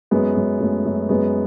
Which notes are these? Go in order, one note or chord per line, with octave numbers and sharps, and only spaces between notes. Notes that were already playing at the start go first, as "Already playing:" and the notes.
F#2 G#3 B3
F#2 G#3
F#2 A3
F#2
F#2 G#3 B3